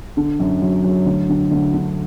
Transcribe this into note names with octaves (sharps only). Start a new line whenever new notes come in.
D3
F#2
F#3
F#3
D2
D3
D2
D3